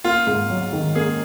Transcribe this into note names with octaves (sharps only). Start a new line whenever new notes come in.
A#3 F4
G#2
F#3
D#3
A#3 G#4